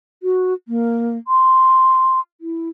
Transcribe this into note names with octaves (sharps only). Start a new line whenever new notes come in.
F#4
A#3
C6
E4